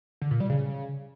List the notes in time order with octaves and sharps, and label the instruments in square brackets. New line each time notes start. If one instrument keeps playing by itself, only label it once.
[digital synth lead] D3
A#2
G3
C#3